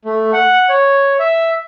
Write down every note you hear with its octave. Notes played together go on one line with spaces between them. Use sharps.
A3
F#5
C#5
E5